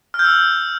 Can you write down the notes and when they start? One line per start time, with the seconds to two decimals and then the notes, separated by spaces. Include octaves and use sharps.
0.14 F6
0.19 G6
0.24 E6